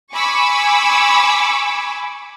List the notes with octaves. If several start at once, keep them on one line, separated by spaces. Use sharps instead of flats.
G#5 B5 C#6 D6 E6